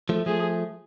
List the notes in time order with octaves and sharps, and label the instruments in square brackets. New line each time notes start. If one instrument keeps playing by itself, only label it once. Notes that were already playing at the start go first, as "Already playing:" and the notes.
[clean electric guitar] F3 A3
[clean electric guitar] F3 A3 [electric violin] G#4